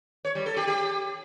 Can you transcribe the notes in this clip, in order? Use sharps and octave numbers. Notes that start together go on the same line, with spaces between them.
C#5
G3
A4
G4
G4